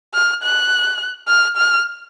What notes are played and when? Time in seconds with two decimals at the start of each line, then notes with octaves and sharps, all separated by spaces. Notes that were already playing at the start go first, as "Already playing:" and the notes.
0.14 F6
0.43 F#6
1.28 F6
1.57 F6